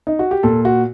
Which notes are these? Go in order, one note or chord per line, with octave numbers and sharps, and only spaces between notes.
D#4
F#4
G4
A#2 A4
F#4